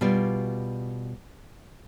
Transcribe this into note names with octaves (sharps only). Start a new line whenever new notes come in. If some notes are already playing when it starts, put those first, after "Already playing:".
B2 G3 F4 D5